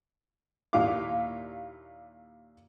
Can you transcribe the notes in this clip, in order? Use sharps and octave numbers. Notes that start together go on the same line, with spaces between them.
D#2 A#2 E4 F5 D6